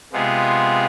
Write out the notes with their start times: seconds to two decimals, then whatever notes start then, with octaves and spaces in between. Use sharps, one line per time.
0.12 C3 G#3 B3 F4 G#4